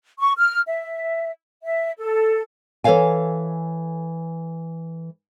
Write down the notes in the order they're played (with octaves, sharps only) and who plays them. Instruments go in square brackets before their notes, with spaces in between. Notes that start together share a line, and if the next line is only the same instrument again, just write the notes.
[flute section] C#6
F6
E5
E5
A4
[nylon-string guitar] E3 A4 C5 C#5 F5 G#5